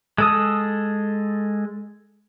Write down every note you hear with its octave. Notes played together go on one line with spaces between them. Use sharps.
G#3 A4 D#6